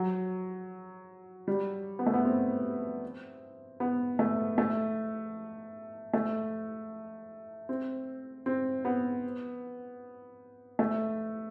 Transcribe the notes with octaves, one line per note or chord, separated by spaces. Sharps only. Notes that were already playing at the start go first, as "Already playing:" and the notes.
Already playing: F#3
G3
B3
A3
B3
C4
B3
A3
A3
A3
C4
C4
B3
A3